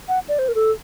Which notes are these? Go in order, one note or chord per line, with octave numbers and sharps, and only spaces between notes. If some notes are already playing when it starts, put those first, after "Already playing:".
F#5
D5
C5
A#4
A4